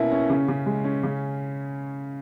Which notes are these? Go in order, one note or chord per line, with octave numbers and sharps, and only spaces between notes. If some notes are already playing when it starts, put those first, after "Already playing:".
Already playing: B2 A#3 C#4 E4
C#4
C#3
C#3
G#3
C#4
C#3